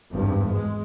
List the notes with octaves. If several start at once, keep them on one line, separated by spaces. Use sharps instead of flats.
G#1 E2 G2
G#3